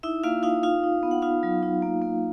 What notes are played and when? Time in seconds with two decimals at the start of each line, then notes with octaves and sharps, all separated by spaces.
0.03 D#4 E4 E5
0.23 A#3 F4 F5
0.43 D#4 F4 F5
0.63 D#4 F4 F5
0.84 D#4
1.03 B3
1.11 F#5
1.22 D#4 F4 F5
1.43 F#3
1.63 D#4
1.82 A#3
2.02 A#3